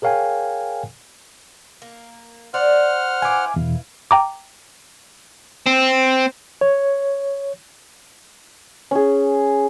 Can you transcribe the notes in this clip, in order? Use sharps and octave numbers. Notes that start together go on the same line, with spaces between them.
G#4 A#4 C#5 F5 G5 G#5
A#3
C5 D5 F#5 F6
E4 B4 F5 G#5 D6
E2 B2
G5 A#5 D6
C4
C#5
C#4 G#4